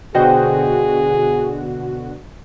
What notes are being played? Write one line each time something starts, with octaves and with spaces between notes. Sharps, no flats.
B2 D3 F#4 G#4 C5 D#5 G5